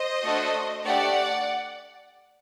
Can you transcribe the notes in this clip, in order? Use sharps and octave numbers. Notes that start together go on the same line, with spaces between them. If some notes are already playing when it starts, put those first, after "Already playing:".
Already playing: C5 D#5
A3 D4 F#4 A4
A3 D4 G4 D5 F#5